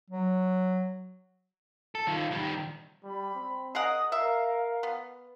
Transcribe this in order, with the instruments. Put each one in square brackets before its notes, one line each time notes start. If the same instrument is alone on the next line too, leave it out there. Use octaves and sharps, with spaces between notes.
[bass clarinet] F#3
[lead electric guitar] A4
D#3 F4
D#3 G3
[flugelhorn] G3 [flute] B5
[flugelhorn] C4
[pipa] G#4 A#4 F#5 [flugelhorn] D#5 [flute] D#6
[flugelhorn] A#4 [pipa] E5 [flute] F5
[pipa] B3